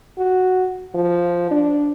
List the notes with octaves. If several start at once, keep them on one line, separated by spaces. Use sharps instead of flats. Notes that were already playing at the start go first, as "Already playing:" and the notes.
F#4
F3
D4